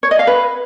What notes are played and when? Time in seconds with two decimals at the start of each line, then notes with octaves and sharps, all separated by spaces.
0.03 C#5
0.11 D#5
0.19 F5
0.27 B4